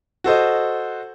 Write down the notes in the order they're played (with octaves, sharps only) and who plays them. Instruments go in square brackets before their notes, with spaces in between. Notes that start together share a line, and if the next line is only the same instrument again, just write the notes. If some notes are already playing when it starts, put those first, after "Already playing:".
[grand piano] F#4 A4 C5 D#5